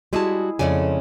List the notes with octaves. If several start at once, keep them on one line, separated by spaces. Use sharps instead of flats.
G3 G#3 E4 F#4 G#4 A5
F2 C#3 G#3 A3 D5 G#5